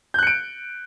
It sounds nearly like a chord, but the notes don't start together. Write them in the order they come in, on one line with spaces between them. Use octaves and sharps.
G6 F#6 C#7 D7